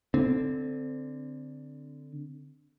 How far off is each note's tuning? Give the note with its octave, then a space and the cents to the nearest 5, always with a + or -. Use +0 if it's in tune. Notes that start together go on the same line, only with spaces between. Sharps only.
D3 +0 C4 -15